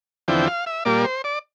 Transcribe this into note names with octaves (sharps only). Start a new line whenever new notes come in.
E2 D3 F3 C4 E4 G5
F5
E5
A#2 G3 A#3 D5
C5
D5